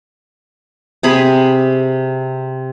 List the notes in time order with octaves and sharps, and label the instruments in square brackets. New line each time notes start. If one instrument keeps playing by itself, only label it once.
[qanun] C3 G#4 B5